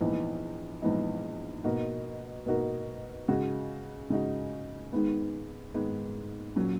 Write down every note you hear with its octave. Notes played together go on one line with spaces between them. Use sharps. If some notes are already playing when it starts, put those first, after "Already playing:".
A#1 G#2 E3 B3 D#4
A#1 G#2 E3 B3 D#4
B2 A#3 D#4 F#4 A#4
B2 A#3 D#4 F#4 A#4
C#3 G#3 D#4 F#4
C#3 G#3 D#4 F#4
G#2 D#3 G#3 B3
G#2 D#3 G#3 B3
A#2 F#3 C#4